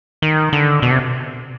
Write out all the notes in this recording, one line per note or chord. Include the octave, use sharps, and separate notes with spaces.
D#3
D3
B2
C3